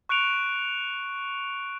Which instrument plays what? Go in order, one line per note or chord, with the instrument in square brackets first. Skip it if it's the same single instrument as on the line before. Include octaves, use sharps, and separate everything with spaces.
[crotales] C#6 F#6 C#7 D7 F7